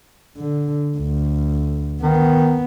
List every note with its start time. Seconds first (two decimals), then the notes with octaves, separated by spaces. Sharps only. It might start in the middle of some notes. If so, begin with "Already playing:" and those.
0.37 D3
0.97 D2
2.03 D#3 B3